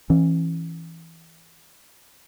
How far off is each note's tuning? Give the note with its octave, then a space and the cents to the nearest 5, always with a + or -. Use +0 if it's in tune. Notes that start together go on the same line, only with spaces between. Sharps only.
E3 +0 C#4 -25